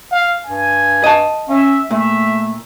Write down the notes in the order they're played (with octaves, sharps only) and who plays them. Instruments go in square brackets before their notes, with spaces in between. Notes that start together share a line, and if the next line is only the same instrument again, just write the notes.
[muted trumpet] F5
[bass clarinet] G2 [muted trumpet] G#5
[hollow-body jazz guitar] D#5 A5
[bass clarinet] C#4 [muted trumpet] E5
[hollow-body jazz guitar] A#2 [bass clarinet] A3 [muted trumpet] E5